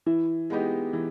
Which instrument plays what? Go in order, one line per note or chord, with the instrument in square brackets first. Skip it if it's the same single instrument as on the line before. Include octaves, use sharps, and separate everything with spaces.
[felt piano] E3 [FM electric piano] E4
[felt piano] G#3 B3 D#4 G4
E3